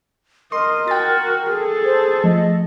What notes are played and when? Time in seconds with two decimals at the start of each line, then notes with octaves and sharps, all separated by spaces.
0.52 A#4 D#5 C6
0.88 F#4 G5 A6
1.52 G#4 A4
1.84 C5
2.24 F3 A3 D#5